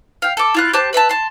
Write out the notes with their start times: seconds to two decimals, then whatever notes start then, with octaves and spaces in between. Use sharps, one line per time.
0.22 F5 G5
0.37 A4 D6
0.55 E4 F4 F#6
0.73 G4 C5 A5 F#6
0.93 B4 E5 F5 A5
1.09 A5 C6